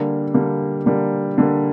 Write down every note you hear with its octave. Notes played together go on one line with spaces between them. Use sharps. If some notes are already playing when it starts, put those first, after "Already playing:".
Already playing: D3 G3 A#3
D3 G3 A#3
D3 G3 A#3
D3 G3 A#3